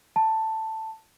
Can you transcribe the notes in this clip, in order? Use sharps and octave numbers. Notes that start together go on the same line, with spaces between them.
A5